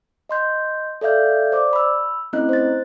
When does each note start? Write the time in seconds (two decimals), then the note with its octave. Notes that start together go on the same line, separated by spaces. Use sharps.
0.29 D#5 C6 G6
1.01 A4 D5 E5 F5 G6
1.52 C5 D5 D6
1.73 B5 E6
2.33 A3 C4 C#4 E4 D#5 F#6
2.49 C5 A6